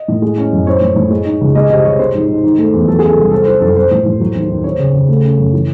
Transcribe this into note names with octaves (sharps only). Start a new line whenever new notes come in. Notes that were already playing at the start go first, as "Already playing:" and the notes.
Already playing: D#5
A2
G#3
C#4
F#2
C4 C#5
A2
A2
G#3
D#4
C#2
G#3 D#5
C3 D#5
C3 C#5
C4 C5
G#2
G#2
D#3
A3
E2
F#3 A4
G#4
C#4
A4
C2
C4 A4
E4 C5
F#2 A4
C4 C5
A2
A2
F#3
D#2
D#2
C4 C#5
C#3
C#3
A3
C#4
F#2
E3